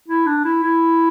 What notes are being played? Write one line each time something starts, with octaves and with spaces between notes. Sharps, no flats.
E4
D4
E4
E4